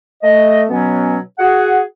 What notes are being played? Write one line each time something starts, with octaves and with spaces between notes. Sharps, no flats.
A3 D#5
B2 F#3 B3 C#4
F#4 G#4 F#5